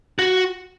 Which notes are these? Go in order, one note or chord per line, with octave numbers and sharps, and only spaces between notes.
F#4